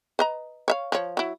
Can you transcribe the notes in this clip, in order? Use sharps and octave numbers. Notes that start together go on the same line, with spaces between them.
B4 D#5 A#5
C#5 E5 F5
F3 C#5
F#3 E4